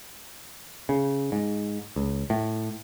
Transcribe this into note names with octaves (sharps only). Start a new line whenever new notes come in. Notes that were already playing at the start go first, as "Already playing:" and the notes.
C#3
G#2
C#2
A2